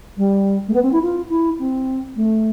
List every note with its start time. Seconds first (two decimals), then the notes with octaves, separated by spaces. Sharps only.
0.17 G3
0.68 A3
0.73 B3
0.82 C4
0.92 E4
1.02 F4
1.29 E4
1.59 C4
2.16 A3